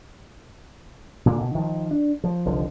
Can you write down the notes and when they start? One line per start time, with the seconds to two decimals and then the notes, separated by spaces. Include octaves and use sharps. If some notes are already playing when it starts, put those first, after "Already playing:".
1.26 A#2 D3 A#3
1.41 B2
1.55 D#3 F3
1.91 D4
2.24 F3
2.45 F1 C2 D3 F3